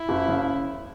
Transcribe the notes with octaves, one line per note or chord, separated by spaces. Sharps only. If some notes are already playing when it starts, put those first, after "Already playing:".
Already playing: E4
F#1
C#3